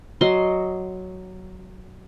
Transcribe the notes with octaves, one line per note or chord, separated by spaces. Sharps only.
F#3 D#5 C6